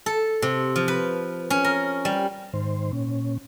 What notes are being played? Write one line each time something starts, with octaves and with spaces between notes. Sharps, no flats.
A4
C3
F3
B4
C#4
A#4
G3
G#2 D#3 C5
A#2 C#4